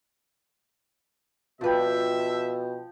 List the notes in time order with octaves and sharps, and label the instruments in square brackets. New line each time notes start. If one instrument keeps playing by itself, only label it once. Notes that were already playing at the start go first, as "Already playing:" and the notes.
[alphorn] B2 [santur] F3 G5 [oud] D4 B4 [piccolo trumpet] E5